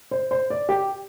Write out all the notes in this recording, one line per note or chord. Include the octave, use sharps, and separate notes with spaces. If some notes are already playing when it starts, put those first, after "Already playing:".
C5
C5
D5
G4